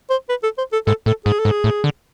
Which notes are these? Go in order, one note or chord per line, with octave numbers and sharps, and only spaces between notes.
C5
B4
A4
C5
A4
G#2 A4
A2 A4
G#2 G#4
A4
G#2
G#4
A2
D3